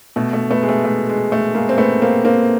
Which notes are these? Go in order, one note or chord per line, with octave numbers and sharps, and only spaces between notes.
B2 A3
A3
A3 B3
G#3
A3
A3
G#3
A3
G#3 A#3
C4
A3 B3
A#3 C4
A#3 C4